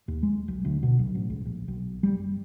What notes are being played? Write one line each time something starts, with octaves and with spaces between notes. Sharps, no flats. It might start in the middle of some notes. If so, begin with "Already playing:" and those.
D#2
G#3
B1
D2
B2
B1
A1
C#2
A#1
B1
G3
F#1